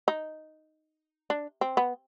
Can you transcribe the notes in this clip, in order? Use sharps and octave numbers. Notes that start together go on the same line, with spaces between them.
D#4
D4
C4
B3